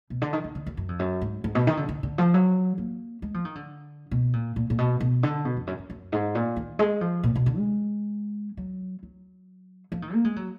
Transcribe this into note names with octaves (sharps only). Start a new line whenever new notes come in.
B2
D3
D#3
D#3
D3
F#2
F#2
F2
F#2
G#2
G#2
B2
D#3
D3
D3
D3
F3
F#3
A#3
G#3
F3
D#3
D3
B2
A#2
A#2
A#2
B2
B2
D3
B2
F2
F#2
F#2
F#2
G#2
A#2
D#3
G#3
F3
A#2
B2
D3
G#3
F#3
F#3
F3
D#3
A#3
G#3
F#3